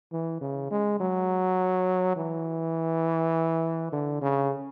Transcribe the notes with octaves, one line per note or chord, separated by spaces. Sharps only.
E3
C#3
G#3
F#3
E3
D3
C#3